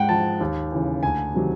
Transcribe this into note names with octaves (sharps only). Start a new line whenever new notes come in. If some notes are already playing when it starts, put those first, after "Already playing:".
Already playing: G#2 F#5 G5
F3 A5
D#2
C#3 E3
D2 G#5
C3 D#3 F#3